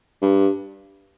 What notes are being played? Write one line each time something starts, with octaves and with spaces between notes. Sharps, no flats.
G2